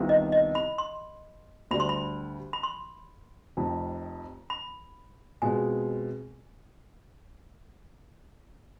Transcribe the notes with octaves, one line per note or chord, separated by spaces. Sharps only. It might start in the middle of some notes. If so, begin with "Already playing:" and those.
Already playing: C2 C3 D#3 B3 F4
D#5
D#5
B5
C6
D2 D3 G3 B5
C6
B5
B5
C6
F1 F2 C3
B5
B2 G#3 C4 F4 G#5